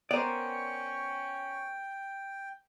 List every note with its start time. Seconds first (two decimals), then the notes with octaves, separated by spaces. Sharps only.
0.11 B3 C#4 A#4 C5 D5 G5 C#6